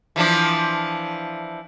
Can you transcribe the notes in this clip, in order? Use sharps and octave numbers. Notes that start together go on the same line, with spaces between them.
E3 F3 D4